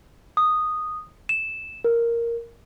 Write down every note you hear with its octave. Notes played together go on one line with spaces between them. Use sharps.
D#6
E7
A#4